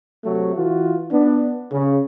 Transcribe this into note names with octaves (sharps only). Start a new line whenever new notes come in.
C3 F#3 A3
E3 F4 F#4
B3 D4
C#3